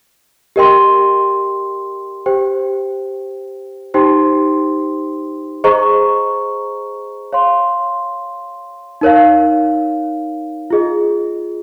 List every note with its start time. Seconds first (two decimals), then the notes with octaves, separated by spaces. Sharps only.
0.56 G4 A#4 D#5 G5 C6
2.26 G4 C5 G5
3.94 D#4 G4 C5 G5 C6
5.64 G#4 C5 D#5 A#5 C#6
7.33 C#5 F5 C6
9.01 D#4 A#4 C#5 F5
10.70 F4 G#4 D#5